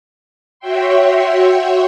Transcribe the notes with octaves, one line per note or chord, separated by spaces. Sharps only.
F#4 C#5 E5 G5 C6